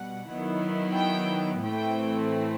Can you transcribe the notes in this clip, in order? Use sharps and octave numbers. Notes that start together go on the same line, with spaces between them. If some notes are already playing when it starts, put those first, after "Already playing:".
Already playing: B2 G3 F#5
D#3 F#3 B3 E4
G5
A2 E3 A3 C4 E4 G5